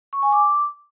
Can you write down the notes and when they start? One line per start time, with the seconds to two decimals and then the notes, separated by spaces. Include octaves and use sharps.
0.13 C#6
0.23 G#5
0.32 D6